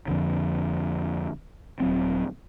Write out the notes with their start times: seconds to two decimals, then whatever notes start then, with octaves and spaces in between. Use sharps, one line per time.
0.08 F2 D3
1.80 D#1 F#3 C4